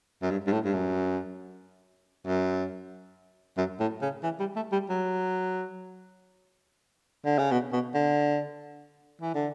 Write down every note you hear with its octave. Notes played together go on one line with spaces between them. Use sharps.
F#2
G2
G2
A2
G2
F#2
F#2
F#2
A2
C#3
E3
G3
A3
G3
F#3
D3
C#3
B2
B2
D3
E3
D3